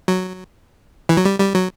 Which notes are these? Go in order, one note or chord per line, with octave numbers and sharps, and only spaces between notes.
F#3
E3
F#3
G3
G3
F#3